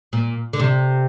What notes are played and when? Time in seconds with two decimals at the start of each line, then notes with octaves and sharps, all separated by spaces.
0.13 A#2
0.53 D3
0.59 C3